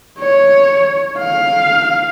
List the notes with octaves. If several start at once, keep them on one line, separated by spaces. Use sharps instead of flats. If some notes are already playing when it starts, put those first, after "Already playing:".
C#5
F5